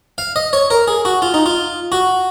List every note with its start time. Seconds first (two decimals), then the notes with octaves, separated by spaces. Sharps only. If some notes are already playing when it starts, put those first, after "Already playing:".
0.18 F5
0.36 D#5
0.53 C#5
0.70 A#4
0.88 G#4
1.05 F#4
1.22 F4
1.34 D#4
1.46 F4
1.92 F#4